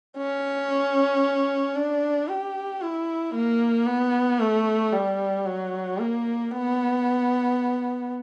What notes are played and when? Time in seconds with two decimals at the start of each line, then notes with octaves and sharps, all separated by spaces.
0.17 C#4
1.76 D4
2.29 G4
2.82 E4
3.34 A#3
3.87 B3
4.40 A3
4.93 G3
5.46 F#3
5.99 A#3
6.52 B3